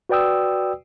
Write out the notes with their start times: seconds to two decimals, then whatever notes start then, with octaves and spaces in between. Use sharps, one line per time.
0.09 F#4 B4 D5 G5 D#6 E6